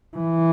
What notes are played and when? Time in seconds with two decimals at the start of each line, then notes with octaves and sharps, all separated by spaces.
0.17 E3